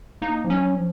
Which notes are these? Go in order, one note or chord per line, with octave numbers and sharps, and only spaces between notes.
A#3 D#4
F3
F#3 C#4
F3